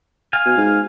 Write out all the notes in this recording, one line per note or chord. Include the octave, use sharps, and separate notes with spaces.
F5 G#5
B2
G#2